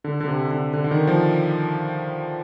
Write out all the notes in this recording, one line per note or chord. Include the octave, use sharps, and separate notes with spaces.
D3
D3
C3
D3
D3
D3
D#3
F3